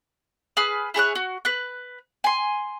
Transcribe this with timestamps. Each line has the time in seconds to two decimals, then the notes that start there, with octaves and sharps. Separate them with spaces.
0.57 G#4 B4 F6
0.94 E4 G#4 C#5 F#6
1.15 F#4
1.45 B4 F#6
2.24 G#5 C6